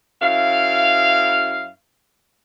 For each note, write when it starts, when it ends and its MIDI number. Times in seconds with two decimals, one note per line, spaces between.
0.22 1.70 42
0.22 1.70 64
0.22 1.70 77